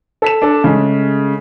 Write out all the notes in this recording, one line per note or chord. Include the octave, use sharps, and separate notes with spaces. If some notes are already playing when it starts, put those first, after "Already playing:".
A4 B6 E7
D4 A4
C#3 G#3 A3